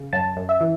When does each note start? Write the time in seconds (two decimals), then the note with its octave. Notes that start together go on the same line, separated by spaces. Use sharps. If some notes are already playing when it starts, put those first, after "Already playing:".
Already playing: C#3
0.13 F#2 A5
0.37 F#2
0.49 E5
0.61 E3